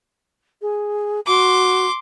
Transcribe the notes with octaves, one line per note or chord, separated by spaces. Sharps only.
G#4
F#4 C6 D6